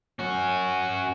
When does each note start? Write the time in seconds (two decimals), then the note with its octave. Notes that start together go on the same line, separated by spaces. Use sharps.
0.19 C#4 F#4